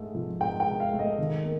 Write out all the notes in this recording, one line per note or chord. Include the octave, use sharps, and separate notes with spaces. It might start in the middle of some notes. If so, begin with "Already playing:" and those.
Already playing: G#2 A3
F3
G#2 G5
G5
G#2
F5
A3
D#5
D#3
A#3